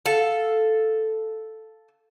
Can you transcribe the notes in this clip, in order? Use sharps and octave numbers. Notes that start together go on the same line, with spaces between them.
A4 F5